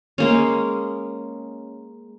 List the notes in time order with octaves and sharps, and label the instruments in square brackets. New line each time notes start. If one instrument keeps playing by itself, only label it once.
[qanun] G#3 A#3 C#4